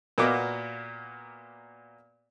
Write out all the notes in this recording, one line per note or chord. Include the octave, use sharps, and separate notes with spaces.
A#2 A#3 B3 F#4 D#5 D6